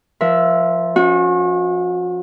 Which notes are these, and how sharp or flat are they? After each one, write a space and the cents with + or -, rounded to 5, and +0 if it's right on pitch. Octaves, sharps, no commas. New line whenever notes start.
F3 +0 A#4 +40 E5 +0
C#4 +0 F#4 -40